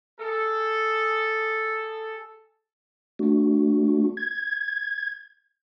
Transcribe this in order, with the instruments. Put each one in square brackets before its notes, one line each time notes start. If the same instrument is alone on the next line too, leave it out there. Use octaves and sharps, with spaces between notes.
[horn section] G#4 A4
[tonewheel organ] A3 D4 F#4
G#6